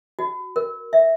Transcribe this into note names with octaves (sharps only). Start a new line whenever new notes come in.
F#4
A#4
E5